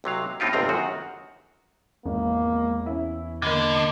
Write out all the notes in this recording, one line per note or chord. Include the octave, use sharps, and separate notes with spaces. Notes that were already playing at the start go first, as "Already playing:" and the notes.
B1 C3 F#3 F5
A2 C4 D#4 F4 G4
G1 C#2 C3 C4 A#5
F#2 D#3 F#4
G#1 E2 A#3
C#4 E4
D3 A#3 D#5 B5 G#6